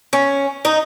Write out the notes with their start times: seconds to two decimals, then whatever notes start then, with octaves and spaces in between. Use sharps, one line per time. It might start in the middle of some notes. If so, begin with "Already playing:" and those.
0.13 C#4
0.65 D#4